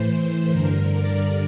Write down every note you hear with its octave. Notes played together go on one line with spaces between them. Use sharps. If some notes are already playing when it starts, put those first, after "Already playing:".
Already playing: A2 E3 C5
G2 D3 A#4
D5